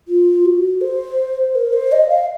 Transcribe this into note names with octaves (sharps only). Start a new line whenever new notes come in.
F4
F#4
C5
A#4
C5
D#5
F5